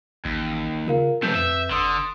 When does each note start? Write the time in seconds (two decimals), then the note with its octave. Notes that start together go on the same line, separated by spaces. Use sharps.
0.25 A1 D#2
0.87 C#3 F4 A#4 F5
1.23 C3 F3 A3 B4 E6 G6
1.35 F2 E5
1.71 G1 D3 C6 D#6